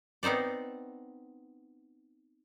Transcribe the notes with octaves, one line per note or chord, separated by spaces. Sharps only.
B3 C4 D#4 C5 D5